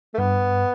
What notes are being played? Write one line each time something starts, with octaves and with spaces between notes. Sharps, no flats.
A3
G2 B3